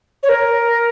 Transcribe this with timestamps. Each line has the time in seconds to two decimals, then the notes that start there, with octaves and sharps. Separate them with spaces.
0.23 C#5
0.29 A#4